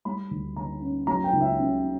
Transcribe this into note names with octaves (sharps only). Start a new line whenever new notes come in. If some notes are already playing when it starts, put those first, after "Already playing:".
G3 B5
D2
D3 A#5
C#4
F#3 A#5
G5
C#2
E5
C#3
C#4